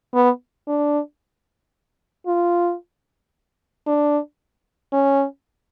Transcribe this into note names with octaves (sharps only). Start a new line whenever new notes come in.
B3
D4
F4
D4
C#4